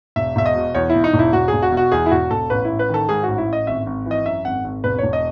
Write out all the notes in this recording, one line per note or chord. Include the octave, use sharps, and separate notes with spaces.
E1 E5
E1 E5
D#5
B2
E2 C#5
E1 E4
D#4
E1
E4
E1 F#4
E1 G#4
F#4
B2
F#4
E2 G#4
E4
E1 F#4
E1 A4
A1 B4
A1 E4
B4
D#3 A4
G#2 G#4
A1 F#4
E4
A1
D#5
G#1 E5
G#1
E3 D#5
F#2 E5
G#1 F#5
G#1
E1 B4
E1 C#5
D#5